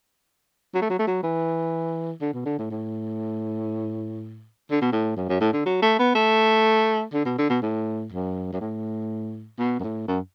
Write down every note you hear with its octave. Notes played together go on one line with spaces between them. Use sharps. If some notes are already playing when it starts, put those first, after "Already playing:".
F#3
A3
F#3
A3
F#3
E3
D3
B2
D3
A2
A2
D3
B2
A2
F#2
F#2
A2
D3
F#3
A3
B3
A3
D3
B2
D3
B2
A2
F#2
F#2
A2
B2
F#2
A2
F#2